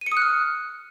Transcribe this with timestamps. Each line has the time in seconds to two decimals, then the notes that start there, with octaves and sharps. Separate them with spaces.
0.01 D#7
0.06 C#7
0.12 D#6
0.17 F#6
0.22 F6